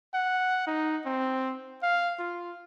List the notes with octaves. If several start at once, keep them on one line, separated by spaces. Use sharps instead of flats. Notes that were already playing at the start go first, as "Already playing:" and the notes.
F#5
D#4
C4
F5
F4